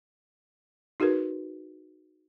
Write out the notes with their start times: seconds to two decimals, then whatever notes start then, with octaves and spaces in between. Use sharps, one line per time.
1.00 D#4 F#4 G#4 A#4 B4